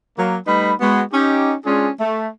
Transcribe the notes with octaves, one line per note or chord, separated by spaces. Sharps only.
F#3 A#3
G3 A3 D#4 B4 B5
G#3 B3 F#4
C#4 D#4 G4
G#3 C#4 D4 F4 G#4
A3